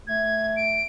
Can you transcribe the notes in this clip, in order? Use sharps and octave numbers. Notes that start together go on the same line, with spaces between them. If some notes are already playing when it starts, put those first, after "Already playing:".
A3 G#6
D7